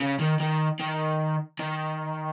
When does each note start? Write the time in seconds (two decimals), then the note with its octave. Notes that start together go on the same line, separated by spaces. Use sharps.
0.01 C#3
0.20 D#3
0.40 D#3
0.80 D#3
1.59 D#3